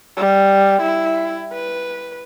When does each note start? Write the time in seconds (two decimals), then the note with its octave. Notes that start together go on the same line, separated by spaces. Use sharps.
0.17 G3
0.82 E4
1.53 B4